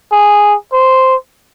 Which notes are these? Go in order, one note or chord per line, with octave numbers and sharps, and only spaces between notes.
G#4
C5